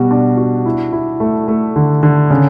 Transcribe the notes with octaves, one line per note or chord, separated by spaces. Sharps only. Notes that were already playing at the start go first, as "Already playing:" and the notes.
Already playing: B2 G3 F#4
D4
F#4
E4
E4
A3
A3
D3
D3
C#3